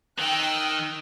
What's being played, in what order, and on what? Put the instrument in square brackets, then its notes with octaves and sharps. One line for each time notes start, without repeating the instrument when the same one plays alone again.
[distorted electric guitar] D#3 [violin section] G5 E6 F#6